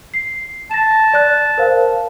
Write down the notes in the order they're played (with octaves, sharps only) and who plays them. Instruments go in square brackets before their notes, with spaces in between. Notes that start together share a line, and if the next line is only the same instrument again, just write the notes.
[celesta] C7
[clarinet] A5 [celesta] A#6 E7
[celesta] D5 F#6
A#4 C5 F5